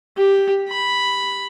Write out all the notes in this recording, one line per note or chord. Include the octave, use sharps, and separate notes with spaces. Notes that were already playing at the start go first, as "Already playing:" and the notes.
G4
B5